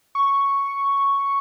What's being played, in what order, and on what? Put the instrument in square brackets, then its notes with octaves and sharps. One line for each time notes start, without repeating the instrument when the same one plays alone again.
[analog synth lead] C#6